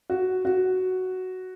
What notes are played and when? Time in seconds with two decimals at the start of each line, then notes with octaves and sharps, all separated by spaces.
0.10 F#4
0.45 F#4